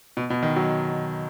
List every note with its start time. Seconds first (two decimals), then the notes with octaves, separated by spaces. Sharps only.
0.17 B2
0.30 B2
0.43 D#3
0.56 F#3